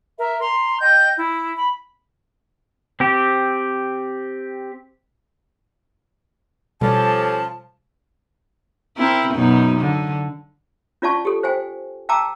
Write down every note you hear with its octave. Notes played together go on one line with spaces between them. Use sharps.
A#4 E5
A#5 C6
D#5 G5 G6
E4
B5
C4 G4
B2 F3 G3 C#4 G4 A4 A5
C4 E4 A#4
F#2 B2 D#4
D3
C#4 F4 D5 F5 A5 C#6
G4 A4
C5 F5 G5 G#5
F5 G5 A5 A#5 D6 E6